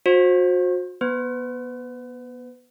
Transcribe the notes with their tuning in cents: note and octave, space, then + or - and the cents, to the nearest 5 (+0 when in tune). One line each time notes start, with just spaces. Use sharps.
F#4 -35 C5 +20
B3 -25 B4 +35